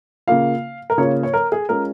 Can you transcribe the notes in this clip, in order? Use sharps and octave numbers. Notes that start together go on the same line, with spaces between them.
C#3 A#3 F4 F5
A#4
C#3 A#3 F4 C#5
C#5
A#4
G#4
G#3 C#4 F4 A#4